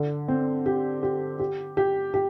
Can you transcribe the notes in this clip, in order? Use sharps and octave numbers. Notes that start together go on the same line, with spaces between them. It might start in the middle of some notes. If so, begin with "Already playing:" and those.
Already playing: D3
C4
G4
G4
G4
G4
G4